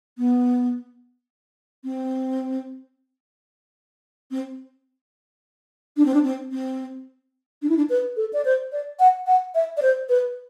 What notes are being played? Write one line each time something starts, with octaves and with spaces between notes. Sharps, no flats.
B3
C4
C4
D4
C4
D4
C4
C4
D4
E4
D4
B4
A4
D5
C5
D5
F#5
F#5
E5
D5
C5
B4